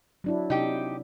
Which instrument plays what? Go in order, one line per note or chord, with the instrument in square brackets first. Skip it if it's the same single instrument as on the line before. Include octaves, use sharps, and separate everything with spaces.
[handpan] F#3 D4 E4
[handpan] C3 [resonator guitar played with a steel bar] D#4 G4